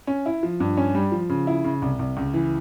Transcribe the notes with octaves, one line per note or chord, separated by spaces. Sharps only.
C#4
E4
F3
G2
C#4
G3
F3
C#3
E4
C#3
C2
C2
C#2
E3